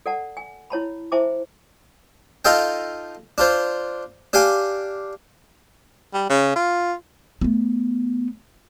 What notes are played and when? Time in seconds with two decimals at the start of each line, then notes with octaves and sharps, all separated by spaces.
0.06 A4 D5 F#5 A5
0.37 G#5
0.70 E4 C#5 A5 B5
1.12 E4 C5 E5 G#5 A5 D6
2.45 D#4 F4 A4 D#5 F5 G5
3.38 D4 F4 C5
4.33 D4 G4 F5 G#5 D6
6.14 G3
6.29 C#3
6.56 F4
7.41 A3 B3